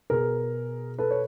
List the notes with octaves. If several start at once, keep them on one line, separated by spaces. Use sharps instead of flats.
B2 G#4 A#4
A4 B4
C#5